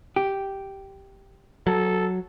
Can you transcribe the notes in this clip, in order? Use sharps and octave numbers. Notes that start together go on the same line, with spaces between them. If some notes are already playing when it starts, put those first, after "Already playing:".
G4
F#3 A4